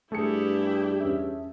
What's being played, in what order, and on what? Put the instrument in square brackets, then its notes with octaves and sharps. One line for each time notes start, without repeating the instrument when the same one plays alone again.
[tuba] G2 [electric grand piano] A3 G#4 C#7 [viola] E4 G4
[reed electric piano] E2 C#4 E5